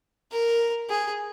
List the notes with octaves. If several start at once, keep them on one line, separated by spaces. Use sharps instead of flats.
A#4
G#4